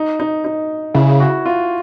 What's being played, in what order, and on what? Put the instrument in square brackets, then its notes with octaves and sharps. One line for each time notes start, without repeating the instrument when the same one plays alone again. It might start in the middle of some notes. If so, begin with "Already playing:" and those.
Already playing: [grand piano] D#4
D#4
D#4
[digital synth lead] C#3 [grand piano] E4
[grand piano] F#4
F4